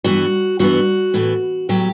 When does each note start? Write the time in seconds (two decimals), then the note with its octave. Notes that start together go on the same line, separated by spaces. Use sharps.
0.04 G2 E3 B3 F#4
0.59 G2 E3 B3 F#4
1.14 A2 E3 B3
1.69 A2 F#3 B3 G4